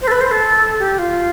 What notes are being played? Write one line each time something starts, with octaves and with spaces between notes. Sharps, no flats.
C5
A4
B4
C5
A4
G4
F4